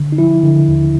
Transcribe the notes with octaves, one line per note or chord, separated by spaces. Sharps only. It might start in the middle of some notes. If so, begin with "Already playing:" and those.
Already playing: D3
D#4
F3 E4
D3
D#2